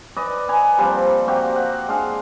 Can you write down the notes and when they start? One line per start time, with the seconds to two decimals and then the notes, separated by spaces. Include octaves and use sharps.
0.17 B4 D5 D#5
0.49 B4 G#5 A#5
0.78 F3 G3 A#3 C4
1.27 A#3 C4 F#4 G4
1.56 F#5
1.88 G#3 D4 F5